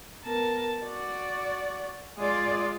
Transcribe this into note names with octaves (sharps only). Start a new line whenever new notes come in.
B3 A#4 A5
F#4 D5
G#3 F4 G#4 D5